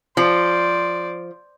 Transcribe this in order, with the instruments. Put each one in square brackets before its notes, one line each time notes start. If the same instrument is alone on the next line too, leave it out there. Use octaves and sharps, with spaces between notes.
[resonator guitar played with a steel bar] F3 [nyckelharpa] C5 D5